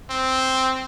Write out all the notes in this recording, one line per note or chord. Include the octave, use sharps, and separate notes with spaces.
C4